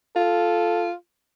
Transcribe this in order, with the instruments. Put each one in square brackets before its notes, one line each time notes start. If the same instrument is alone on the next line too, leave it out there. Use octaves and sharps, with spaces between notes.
[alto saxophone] F4 [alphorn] A4